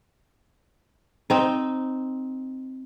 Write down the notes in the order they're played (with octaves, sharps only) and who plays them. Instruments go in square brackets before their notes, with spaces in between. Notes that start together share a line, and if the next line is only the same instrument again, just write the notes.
[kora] C4 D#4